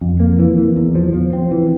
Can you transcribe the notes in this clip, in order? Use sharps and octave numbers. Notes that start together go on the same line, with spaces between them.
F2
A#3
E3
E3
E2
F3
F3
C4
E3